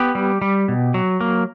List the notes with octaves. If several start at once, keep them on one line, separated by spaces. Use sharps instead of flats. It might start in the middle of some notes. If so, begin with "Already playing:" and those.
Already playing: B3 G4
G3
G3
B2
F#3
A#3